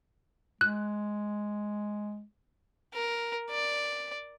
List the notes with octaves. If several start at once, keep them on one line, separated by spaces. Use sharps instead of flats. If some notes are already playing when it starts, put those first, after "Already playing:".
G#3 F#6
A#4
D5